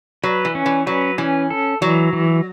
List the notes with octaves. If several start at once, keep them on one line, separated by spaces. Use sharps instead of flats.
F#3 B4
E3
C#4
E3
F#3 B4
E3 C#4
A4
E3 F#3
E3